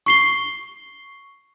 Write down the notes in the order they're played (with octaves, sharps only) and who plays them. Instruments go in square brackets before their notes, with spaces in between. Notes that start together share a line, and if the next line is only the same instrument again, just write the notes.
[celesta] C#6 C7 G7